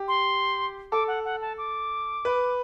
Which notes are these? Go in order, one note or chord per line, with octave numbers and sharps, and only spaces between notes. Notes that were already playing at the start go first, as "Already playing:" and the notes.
Already playing: G4
C6
A4 D6
F#5
F#5
A5
D6
B4